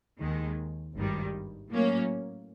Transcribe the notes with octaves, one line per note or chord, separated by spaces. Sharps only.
D#2 D#3 G#3
G#1 G2 D#3 G3
A2 F#3 A#3 C#4